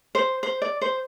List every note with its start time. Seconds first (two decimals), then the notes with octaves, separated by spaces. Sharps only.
0.15 C5
0.43 C5
0.62 D5
0.81 C5